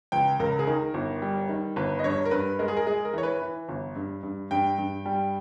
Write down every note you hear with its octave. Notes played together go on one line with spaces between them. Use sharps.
C#2 G5
C#2 A#4
G#4
D#3 A#4
G1
G3
D#3
G1 B4
D#5
G2 C#5
A#4
G2 B4
G#3 A#4
G#4
A#4
G#3 G#4
A#4
E3 C#5
B4
E3
G1
G2
G2
G2 G5
G2
G3